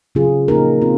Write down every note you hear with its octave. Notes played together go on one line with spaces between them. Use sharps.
C#3 F#3 C#4 F4 G#4
A#2 F3 A#3 D#4 A#4
C4 F4